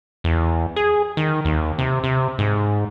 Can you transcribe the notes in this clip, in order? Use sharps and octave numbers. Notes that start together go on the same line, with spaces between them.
E2
G#4
D#3
D#2
C3
C3
G#2